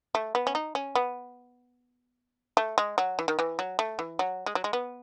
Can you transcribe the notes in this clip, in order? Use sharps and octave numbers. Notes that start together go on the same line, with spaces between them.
A3
B3
C#4
D#4
C#4
B3
A3
G#3
F#3
E3
D#3
E3
F#3
A3
E3
F#3
G#3
F#3
G#3
B3